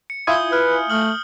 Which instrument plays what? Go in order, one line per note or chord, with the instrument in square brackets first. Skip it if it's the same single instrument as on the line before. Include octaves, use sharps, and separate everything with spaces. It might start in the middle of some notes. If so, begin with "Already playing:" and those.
[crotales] C#7
[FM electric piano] E4 F4 G#5 [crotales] D#6 G6 G7
[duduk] B4 [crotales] F6
[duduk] A3 [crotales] D#6 F6 F#7